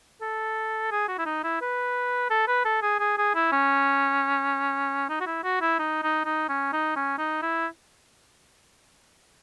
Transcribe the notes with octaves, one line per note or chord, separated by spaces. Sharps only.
A4
G#4
F#4
E4
D#4
E4
B4
A4
B4
A4
G#4
G#4
G#4
E4
C#4
D#4
F#4
E4
F#4
E4
D#4
D#4
D#4
C#4
D#4
C#4
D#4
E4